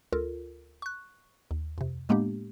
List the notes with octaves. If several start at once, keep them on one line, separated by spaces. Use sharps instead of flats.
D2 F4 A4 A#4
C#6 F#6
D#2
F2 C3
A2 G#3 A#3 B3 D4 G4